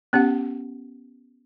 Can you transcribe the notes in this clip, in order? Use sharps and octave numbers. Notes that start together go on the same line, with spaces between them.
B3 C#4 G4 F#5